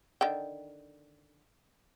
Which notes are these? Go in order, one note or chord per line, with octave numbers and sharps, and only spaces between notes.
D3 D#3 G5